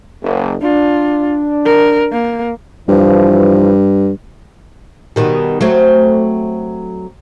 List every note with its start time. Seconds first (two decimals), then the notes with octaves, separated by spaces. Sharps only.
0.23 F#1
0.62 D4 F4
1.66 A#4
2.12 A#3
2.88 G2 E3 F3
5.16 B2 D#3 G3
5.61 F#3 A3 C4